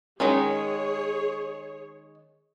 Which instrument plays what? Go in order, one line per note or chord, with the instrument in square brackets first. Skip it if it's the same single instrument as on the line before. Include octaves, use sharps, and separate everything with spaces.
[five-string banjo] D#3 G#3 C#4 [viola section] G#4 C#5